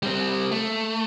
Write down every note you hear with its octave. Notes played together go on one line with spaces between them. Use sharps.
G3 C4
A3